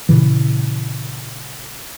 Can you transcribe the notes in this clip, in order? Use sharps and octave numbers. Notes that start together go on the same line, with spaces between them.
A#2 C#3 E3